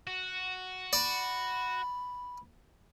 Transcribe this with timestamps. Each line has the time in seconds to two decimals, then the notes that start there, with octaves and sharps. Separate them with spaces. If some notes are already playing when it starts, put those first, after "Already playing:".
0.07 F#4
0.93 D5 B5